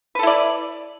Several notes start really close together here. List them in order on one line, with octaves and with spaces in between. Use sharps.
B4 A4 E4 D5